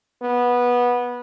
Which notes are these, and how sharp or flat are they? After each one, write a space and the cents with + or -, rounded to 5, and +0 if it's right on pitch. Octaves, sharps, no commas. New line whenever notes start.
B3 -15